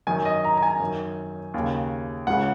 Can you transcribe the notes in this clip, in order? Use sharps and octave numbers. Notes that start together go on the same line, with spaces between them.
F#2 D#3 G#5
D#5
A#5
A#5
G#5
F#2 D#3
D#2 C#3
C#2 C#3 F#5